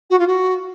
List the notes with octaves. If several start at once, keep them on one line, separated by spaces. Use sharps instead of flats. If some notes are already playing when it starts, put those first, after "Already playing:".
F#4
F4
F#4